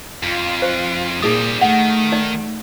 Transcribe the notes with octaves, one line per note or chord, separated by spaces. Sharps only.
F2 F4
C5
A#2 G3 C4 D#4 G#4 D#6
D#3 A3 F#5
D#4 D5